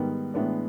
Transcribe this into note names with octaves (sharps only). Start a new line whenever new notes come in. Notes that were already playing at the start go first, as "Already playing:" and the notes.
Already playing: G#2 D#3 G3 B3
A2 E3 G#3 B3 D4